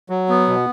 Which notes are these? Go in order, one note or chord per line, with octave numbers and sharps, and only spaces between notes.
F#3
B3
B2